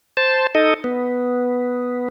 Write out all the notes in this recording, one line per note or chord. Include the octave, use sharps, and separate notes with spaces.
C5 A5
D#4 A4 D#5
B3